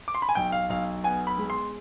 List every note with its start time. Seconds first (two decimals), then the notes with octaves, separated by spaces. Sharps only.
0.08 D6
0.15 C6
0.22 B5
0.29 G#5
0.35 B1 G5
0.52 F5
0.70 B1 F5
1.04 B3 G#5
1.27 B5
1.38 G#3
1.50 C6